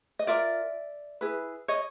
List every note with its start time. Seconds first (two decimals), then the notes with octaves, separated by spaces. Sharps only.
0.19 D#5
0.27 F4 A#4 D5 E5
1.21 E4 G#4 B4
1.68 C#5 D#5